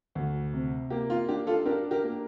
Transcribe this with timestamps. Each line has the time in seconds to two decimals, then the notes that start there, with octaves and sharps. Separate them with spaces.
0.15 D2
0.53 C3
0.90 A#3 G4
1.10 F4
1.28 D4 G4
1.47 F4 A4
1.66 D4 G4 A#4
1.91 G4 A#4
2.04 A#3